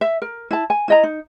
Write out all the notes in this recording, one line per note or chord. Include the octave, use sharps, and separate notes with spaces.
E5
A#4
E4 A5
G#5
E4 D#5 A#5
D#4